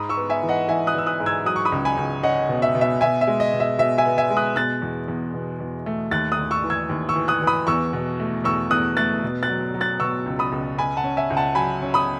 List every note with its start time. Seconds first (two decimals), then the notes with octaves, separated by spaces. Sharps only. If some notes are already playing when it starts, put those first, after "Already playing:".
Already playing: G#2 B5 D#6
0.09 C#6 E6
0.17 B3
0.30 E5 G#5
0.43 E3
0.49 D#5 F#5
0.68 E3 E5 G#5
0.87 D#6 F#6
0.94 E3 E6
1.06 D#6 F#6
1.20 G#2
1.26 E6 G#6
1.45 F#3 D#6 F#6
1.56 C#6
1.65 B5 D#6
1.72 C#2
1.85 G#5 B5
1.97 C#2
2.23 C#4 D#5 F#5
2.49 B2
2.62 E5
2.75 B2
2.81 E5
3.01 B2 E5 G#5
3.21 E5
3.27 G#3
3.40 D#5
3.53 B2
3.60 E5
3.78 B2 E5
3.98 E5 G#5
4.05 B3
4.18 E5 G#5
4.30 G#3
4.37 D#6 F#6
4.56 B2 F#6 A6
4.82 E2
5.08 E2
5.34 B2
5.60 E2
5.86 A3
6.11 D#2 F#6 A6
6.32 D#6 F#6
6.38 D#2
6.51 C#6 E6
6.64 E3
6.70 E6 G#6
6.89 D#2
7.09 C#6 E6
7.15 E3
7.28 D#6 F#6
7.42 E3
7.47 B5 D#6
7.67 E2 C#6 E6
7.93 B2
8.20 A3
8.44 E2 C#6 E6
8.71 E2 D#6 F#6
8.97 A3 F#6 A6
9.23 B2
9.43 F#6 A6
9.49 F#3
9.74 F#3
9.81 F#6 A6
10.00 B2 C#6 E6
10.26 C#2
10.39 B5 D#6
10.52 C#2
10.78 C#2 G#5 B5
10.97 F#5 A5
11.04 C#4
11.17 E5 G#5
11.30 C#2
11.37 F#5 A5
11.55 F#3 G#5 B5
11.82 C#4
11.94 B5 D#6